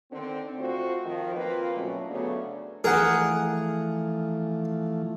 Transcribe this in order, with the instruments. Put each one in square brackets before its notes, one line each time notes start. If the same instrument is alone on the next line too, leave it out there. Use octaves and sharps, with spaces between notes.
[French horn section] D3 D#3 C4
A3 C4 F4 F#4 C5
D#3 F3
A#3 C4 F4 B4
B2 D3 F#3 A3 C#4
C#3 F#3 A3 B3 D4
[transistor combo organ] E3 F3 A3 [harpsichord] G#4 [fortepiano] A#4 F#5